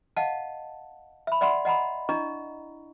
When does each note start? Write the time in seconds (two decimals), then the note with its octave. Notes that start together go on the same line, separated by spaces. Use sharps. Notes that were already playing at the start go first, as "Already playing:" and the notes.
0.17 D#5 F5 F#5 A5
1.27 E5 B5
1.41 D5 E5 F#5 B5 C6
1.65 D#5 F#5 A#5 B5
2.09 D4 E4 D#5 A#5 C#6